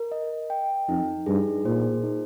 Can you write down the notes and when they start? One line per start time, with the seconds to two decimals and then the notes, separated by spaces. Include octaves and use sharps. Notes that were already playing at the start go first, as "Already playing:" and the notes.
Already playing: A#4
0.12 D#5
0.50 G5
0.89 F2 D#4
1.26 G2 G#4
1.65 A#2 C5
2.03 D#4